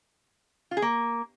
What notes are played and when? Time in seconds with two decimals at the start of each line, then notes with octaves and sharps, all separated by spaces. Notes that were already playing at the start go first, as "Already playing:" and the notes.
0.71 F4
0.77 G#4
0.82 A#3